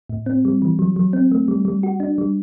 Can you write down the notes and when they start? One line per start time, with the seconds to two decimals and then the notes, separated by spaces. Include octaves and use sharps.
0.09 A2
0.26 C4
0.45 G3
0.62 E3
0.79 F#3
0.96 F#3
1.13 C4
1.32 A3
1.48 G3
1.65 G3
1.83 F#4
2.00 D4
2.18 G3